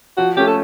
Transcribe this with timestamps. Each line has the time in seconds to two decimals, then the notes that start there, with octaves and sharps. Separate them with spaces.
0.17 F3 F#4
0.37 A3 C#4 G4
0.47 A4